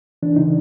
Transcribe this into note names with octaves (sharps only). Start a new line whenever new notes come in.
E3 D4
C#3 D#4